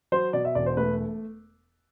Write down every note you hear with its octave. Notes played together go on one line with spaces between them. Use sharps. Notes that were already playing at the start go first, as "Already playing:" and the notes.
F#3 C5
B2 D5
E5
E1 D5
C5
A3 B4